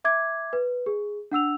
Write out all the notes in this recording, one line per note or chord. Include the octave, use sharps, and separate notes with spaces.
E5 D6 G#6
B4
G#4
D4 F#5 E6 F7